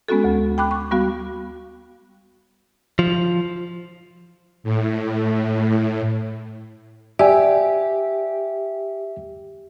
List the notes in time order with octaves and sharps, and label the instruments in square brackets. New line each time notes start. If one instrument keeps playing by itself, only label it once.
[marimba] G#3 B3 C#4 F#4 A4
D2
G5 B5 D6 F#6
C#6
G3 B3 F#4 F5
[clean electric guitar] F3
[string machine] A2
[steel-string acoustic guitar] G4 [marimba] D5 [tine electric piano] E5 G#5